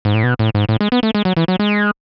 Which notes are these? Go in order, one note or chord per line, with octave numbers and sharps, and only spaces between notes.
G#2
A2
B2
A2
G#2
A2
G#3
B3
A3
G#3
F#3
E3
F#3
G#3